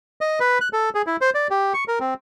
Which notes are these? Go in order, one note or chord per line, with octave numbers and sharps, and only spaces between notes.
D#5
B4
F#6
A4
G#4
E4
C5
D5
G4
C#6
A#4
C4